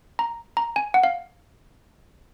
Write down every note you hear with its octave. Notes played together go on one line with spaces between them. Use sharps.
A#5
A#5
G#5
F#5
F5